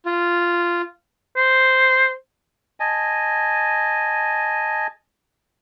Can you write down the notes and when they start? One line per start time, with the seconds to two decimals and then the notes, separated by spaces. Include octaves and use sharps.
0.06 F4
1.37 C5
2.80 D#5 G#5 A5